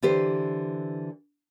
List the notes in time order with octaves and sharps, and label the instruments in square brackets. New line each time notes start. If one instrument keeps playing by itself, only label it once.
[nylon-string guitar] D3 E3 G4 B4 C5